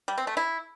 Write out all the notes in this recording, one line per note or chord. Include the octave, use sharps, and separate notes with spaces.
G3
C4
A3
E4